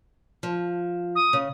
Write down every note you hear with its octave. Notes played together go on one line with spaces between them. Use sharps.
F3
D#6
C#3